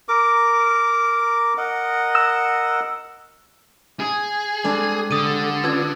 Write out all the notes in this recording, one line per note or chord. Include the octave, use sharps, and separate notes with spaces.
A#4 D6
A#4 D#5 F#5
E6
G#4
G3 G#3 C4 D4 A4
D3 D#6 D#7
C#4 D4 F4 B4 E6 G#6